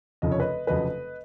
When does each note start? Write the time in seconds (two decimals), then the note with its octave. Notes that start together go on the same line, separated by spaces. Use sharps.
0.22 F1 F2 C#3 F3 D#5
0.32 C#5
0.40 B4 D#5
0.67 F1 F2 C#3 F#3 B4 D#5